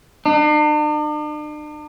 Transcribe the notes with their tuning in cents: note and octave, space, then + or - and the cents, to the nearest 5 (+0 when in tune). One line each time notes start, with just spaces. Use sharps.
D4 +45